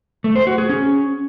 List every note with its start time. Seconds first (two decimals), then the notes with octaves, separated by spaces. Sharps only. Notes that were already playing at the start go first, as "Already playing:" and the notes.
0.24 A3
0.36 C5
0.47 F#4
0.58 G#4
0.69 C#4